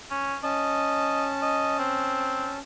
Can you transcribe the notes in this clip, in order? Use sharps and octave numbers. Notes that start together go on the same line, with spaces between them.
C#4
C#4 D#5 A5
D#5
C4